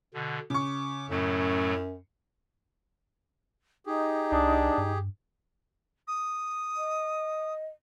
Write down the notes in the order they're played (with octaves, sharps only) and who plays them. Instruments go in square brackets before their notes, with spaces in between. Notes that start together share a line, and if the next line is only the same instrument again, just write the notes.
[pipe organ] B2 D3
[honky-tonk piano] C#3 C#6 [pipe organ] D6
[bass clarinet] F#2 [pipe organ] A2 F#3 A3
[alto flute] D#4 [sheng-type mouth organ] G4 G#4
[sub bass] C2 [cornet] D4
[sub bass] G2
[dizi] D#6
[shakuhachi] D#5